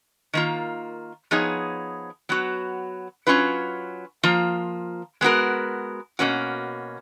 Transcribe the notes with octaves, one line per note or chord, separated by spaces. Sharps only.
D#3 A#3 F4
F3 B3 D#4 G#4 C#5
F#3 B3 F#4
F#3 C#4 F4 B4
F3 A#3 F4
G#3 B3 F#4 A#4
B2 A#3 C#4 F#4